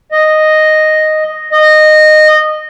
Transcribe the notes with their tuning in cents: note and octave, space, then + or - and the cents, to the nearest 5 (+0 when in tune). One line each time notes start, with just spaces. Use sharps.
D#5 -5
D#5 -15